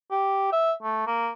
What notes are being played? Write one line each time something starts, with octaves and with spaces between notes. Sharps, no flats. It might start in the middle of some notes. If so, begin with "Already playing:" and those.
G4
E5
A3
A#3